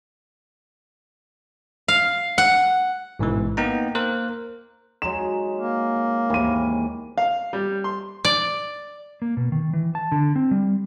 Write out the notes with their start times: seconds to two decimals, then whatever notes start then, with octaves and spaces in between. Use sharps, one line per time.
1.88 F5
2.38 F#5
3.19 A1 G#2 B2 E3
3.57 A#3 B3 D#4 G5 A#5
3.95 A#3 A#4 C5 F#6
5.02 F#3 G#3 D#4 E7
5.56 A#3
6.30 D#2 G#2 E3 D#7
7.18 F5
7.53 G3
7.84 C6
8.25 D5
9.22 A#3
9.37 B2
9.52 D#3
9.73 E3
9.95 A5
10.12 D3
10.36 C4
10.51 G3